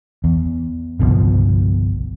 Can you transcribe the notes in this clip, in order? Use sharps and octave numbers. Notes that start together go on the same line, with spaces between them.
E2
G1 C2 B2 F3